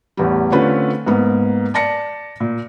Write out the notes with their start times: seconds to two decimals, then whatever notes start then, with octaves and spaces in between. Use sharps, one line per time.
0.17 A1 E2 G3
0.52 D3 A3 C4 C#4 F4 B4
1.07 G#2 A#3 B3
1.74 D5 A5 A#6 C#7
2.40 A#2